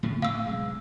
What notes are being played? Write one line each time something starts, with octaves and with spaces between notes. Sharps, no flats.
A2 C#3 F3
A2 C3 F5 E6
B1 G#3